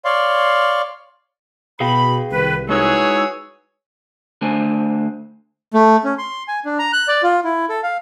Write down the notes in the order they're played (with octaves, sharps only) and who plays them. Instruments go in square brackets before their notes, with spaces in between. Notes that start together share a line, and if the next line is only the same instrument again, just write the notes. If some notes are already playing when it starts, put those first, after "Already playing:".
[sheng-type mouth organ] C#5 D5 F5 C6
[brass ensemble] B2 [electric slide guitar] G#4 F5 G5 [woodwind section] B5
[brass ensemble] C2 [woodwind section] D#3 B4
[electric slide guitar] G#3 D#4 E4 [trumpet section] F#4 G#4 C#5 [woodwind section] B4 E6
[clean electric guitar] D3 A3 D4 C5 G#5
[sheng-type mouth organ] A3
C#4
C6
G#5
D4
A#5
F#6
D5
F4
E4
A4
F5